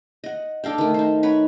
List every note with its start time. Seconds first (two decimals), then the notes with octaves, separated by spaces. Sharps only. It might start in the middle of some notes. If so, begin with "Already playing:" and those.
0.24 D#5 F#5
0.64 D4 A4 F5 G5
0.78 D#3 A3
0.94 D#4 C5
1.23 B4 C#5 F#5 B5